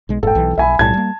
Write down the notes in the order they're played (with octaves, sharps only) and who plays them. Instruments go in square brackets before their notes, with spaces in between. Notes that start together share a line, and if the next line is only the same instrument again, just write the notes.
[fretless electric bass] B1 G#3
[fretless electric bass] F#1 G#2 [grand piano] A4 G5
[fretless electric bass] B1 E3
[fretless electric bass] B1 [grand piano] E5 G#5 B5
[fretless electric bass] B1 A2 G3 [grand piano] A5 G#6
[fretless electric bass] G3 A#3